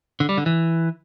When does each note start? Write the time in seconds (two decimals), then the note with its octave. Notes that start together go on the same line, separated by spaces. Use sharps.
0.20 D3
0.29 G3
0.37 D3
0.46 E3